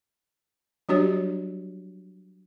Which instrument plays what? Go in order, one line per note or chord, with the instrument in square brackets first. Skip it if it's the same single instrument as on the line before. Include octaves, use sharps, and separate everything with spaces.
[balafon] F#3 G3 D4 F#4 G4 C#5